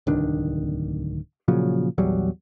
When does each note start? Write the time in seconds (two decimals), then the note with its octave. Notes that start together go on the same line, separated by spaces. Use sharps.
0.07 D1 C2 D#3 D4
1.48 A#2 C#3 F3 F#3
1.98 A#1 E2 F#3 G3